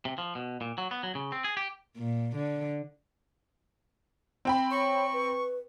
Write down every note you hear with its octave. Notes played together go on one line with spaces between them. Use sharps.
C3
F3
B2
A#2
F#3
B3
F#3
C#3
C4
G#4
G4
A#2
D3
C4 G5 B5
C#5 C#6
B4